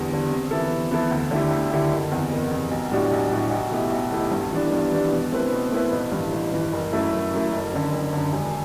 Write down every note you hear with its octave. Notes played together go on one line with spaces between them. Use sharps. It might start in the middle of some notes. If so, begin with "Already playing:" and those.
Already playing: E2 D3 G3
D3 G3
C3
E3 B3 E4 A4
C3
E3 B3 E4 A4
D2
D3 A3 E4 G4
D2
D3 A3 E4 G4
F#1
E2 C3
F#1
E2 C3
B1
A2 G3 D4 F#4
B1
A2 G3 D4 F#4
B1
B2 A3 E4 G4
B1
B2 A3 E4 G4
G2
E3 G3 B3 D4
G2
E3 G3 B3 D4
B2
A3 C4 E4 B4
B2
A3 C4 E4 B4
A1
G2 E3
A1
G2 E3
F#1
F#2 F#3 A3 E4
F#1
F#2 F#3 A3 E4
F#1
F#2 D3
F#1
F#2 D3
E1